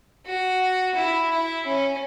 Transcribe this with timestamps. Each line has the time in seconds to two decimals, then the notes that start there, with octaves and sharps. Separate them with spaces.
0.26 F#4
0.95 E4
1.30 E4
1.65 C#4